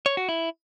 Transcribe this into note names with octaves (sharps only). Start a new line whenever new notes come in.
C#5
F#4
E4